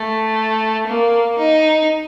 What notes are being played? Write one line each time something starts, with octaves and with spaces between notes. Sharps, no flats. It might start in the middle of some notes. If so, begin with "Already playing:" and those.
Already playing: A3
A#3
D#4